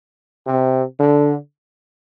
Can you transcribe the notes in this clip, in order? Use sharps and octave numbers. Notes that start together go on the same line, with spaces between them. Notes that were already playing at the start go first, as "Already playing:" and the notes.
C3
D3